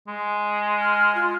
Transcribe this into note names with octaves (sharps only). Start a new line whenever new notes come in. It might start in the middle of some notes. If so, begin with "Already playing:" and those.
G#3
F6
F4